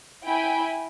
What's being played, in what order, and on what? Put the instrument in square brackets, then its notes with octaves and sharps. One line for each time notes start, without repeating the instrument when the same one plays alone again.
[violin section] E4 G5 G#5 B5